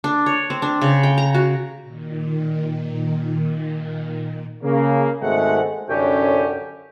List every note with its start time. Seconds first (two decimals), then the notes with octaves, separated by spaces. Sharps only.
0.04 D4
0.26 C#5
0.50 C4
0.62 D4
0.81 C#3
1.03 G5
1.18 A#5
1.34 F#4
1.83 A#2 D#3
4.62 C#3 A#3
5.22 G#1 D#2 G#3 A3 C4 F#5
5.89 C2 F#2 D3 C#4 G4 G5